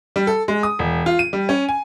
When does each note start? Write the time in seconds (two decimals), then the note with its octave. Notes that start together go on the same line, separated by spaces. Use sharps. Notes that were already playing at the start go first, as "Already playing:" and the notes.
0.16 G3
0.27 A4
0.48 G#3
0.63 D#6
0.79 E1
1.06 F4
1.19 D#7
1.33 G3
1.49 C#4
1.69 G#5